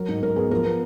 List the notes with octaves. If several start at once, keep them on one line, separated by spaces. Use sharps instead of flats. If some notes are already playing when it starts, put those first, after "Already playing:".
Already playing: F#3 A#4
G#2
G#2 A#4
B3 G#4
F3 A#4
B3